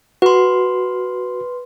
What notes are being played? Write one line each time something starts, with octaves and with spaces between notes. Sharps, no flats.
F#4 B4 C6